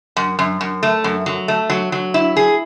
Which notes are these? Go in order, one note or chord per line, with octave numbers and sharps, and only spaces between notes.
F#2
F#2
F#2
A3
F#2
F#3
A3
F#3
F#3
E4
G#4